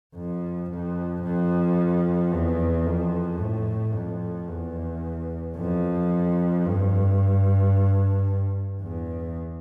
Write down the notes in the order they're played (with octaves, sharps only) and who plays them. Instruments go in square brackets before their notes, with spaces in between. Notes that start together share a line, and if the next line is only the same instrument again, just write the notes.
[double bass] F2
F2
F2
E2
F2
A2
F2
E2
F2
G2
E2